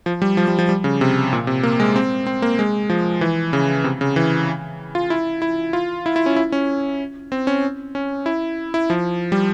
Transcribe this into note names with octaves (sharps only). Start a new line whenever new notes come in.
F3
G3
F3
G3
F3
G3
C#3
C3
A#2
C3
A#3
G#3
C4
C4
A#3
G#3
F3
E3
C#3
C3
C#3
E3
F4
E4
E4
F4
E4
E4
C#4
E4
C#4
C4
C#4
C#4
E4
E4
F3
G3